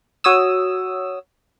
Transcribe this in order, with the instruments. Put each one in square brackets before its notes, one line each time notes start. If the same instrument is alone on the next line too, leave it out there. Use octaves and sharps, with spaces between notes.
[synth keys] F#4 C#5 D#6 E6